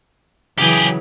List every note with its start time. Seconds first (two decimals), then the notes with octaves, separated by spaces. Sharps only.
0.58 C#3 E3 F#3 G4 G#4